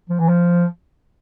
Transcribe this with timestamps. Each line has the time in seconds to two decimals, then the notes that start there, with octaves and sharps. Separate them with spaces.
0.10 F3
0.19 E3
0.29 F3